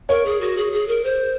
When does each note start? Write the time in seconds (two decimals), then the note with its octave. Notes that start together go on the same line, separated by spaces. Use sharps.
0.09 A#4 C#5
0.26 G#4
0.41 F#4
0.57 G#4
0.73 G#4
0.88 A#4
1.04 C5